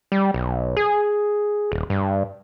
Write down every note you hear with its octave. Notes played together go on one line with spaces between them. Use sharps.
G3
B1
G#4
D#1
G2